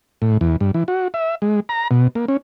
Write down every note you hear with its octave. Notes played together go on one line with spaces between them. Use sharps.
A2
E2
G2
E3
F#4
E5
G#3
A#5
B2
A#3
C#4